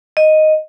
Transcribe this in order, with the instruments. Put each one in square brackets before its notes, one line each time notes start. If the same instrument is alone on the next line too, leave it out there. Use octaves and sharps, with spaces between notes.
[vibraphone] D#5